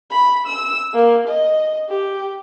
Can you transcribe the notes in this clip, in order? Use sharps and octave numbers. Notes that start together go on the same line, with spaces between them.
B5
E6
A#3
D#5
G4